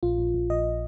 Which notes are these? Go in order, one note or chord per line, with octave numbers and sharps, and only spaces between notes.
A#1 F4
A#1
A#1
A#1 D#5